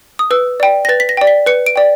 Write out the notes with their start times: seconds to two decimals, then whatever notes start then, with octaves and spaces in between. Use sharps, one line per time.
0.19 D#6
0.31 B4 E6
0.60 D5 G5
0.85 A#6
0.89 B4 A6
1.00 B6
1.09 A#6
1.17 D5 G5
1.27 B6
1.46 B4 C#7
1.66 D7
1.76 D5 G5